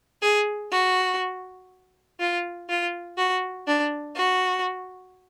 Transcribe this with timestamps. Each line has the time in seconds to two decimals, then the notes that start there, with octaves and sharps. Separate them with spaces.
0.22 G#4
0.72 F#4
2.20 F4
2.69 F4
3.18 F#4
3.67 D4
4.16 F#4